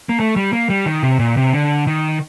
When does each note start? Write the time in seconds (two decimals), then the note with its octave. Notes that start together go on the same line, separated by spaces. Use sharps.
0.09 A#3
0.20 A3
0.36 G3
0.53 A#3
0.70 G3
0.86 D#3
1.03 C3
1.19 A#2
1.37 C3
1.53 D3
1.87 D#3